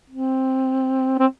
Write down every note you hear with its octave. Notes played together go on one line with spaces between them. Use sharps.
C4
C4